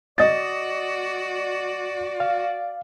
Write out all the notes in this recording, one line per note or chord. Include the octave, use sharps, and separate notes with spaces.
F#4 D5 D#5 A6
F5